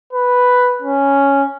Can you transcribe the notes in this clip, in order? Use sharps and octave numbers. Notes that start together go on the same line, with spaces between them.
B4
C#4